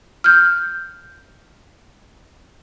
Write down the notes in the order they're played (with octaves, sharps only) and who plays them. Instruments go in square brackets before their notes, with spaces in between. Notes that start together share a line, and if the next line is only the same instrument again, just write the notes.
[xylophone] F6 G6